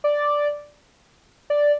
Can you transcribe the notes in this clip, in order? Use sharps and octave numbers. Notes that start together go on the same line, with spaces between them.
D5
D5